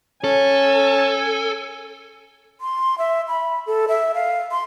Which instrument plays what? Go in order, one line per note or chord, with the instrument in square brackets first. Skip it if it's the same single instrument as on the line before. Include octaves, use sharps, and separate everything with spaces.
[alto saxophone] C#4 [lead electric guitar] A4 [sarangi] G#5
[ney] C6
E5
B5
A4
E5
F5
C6